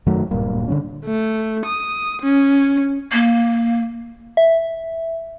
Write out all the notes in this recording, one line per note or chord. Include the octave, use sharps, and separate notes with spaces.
F#2 D#3 F#3 A3
D1 G2 A#2 A#3
D3 E3 C#4
A3
D#6
C#4
A#3
E5